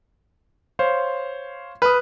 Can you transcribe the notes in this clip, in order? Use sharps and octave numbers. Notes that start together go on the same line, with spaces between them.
C5 C#5 F5
B4 D#6 F6